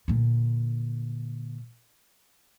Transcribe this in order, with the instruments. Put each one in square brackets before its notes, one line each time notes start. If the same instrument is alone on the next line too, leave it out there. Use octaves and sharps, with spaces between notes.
[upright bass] A#2 D3